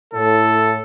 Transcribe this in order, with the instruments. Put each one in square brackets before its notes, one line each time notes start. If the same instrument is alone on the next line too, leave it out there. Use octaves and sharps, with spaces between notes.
[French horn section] A2 [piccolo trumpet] A4